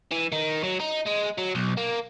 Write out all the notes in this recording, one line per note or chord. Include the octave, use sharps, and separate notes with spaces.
E3
D#3
F#3
D#4
G#3
F#3
B1
A#3